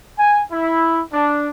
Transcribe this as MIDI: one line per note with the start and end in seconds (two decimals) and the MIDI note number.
0.17 0.42 80
0.50 1.01 64
1.12 1.48 62